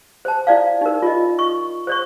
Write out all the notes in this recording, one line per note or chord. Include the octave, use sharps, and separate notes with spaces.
C5 A5
E4 D5 F5
D#4 A#4
F4 D#5
C#6
C5 C#5 C#6